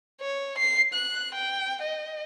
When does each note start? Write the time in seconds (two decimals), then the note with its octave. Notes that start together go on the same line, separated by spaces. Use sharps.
0.21 C#5
0.58 C7
0.94 F#6
1.34 G5
1.82 D#5